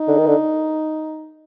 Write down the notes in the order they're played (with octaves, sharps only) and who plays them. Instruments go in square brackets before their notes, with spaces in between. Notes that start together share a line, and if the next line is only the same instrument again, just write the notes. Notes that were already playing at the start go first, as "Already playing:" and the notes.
Already playing: [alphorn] D#4
[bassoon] D3
D#3
D3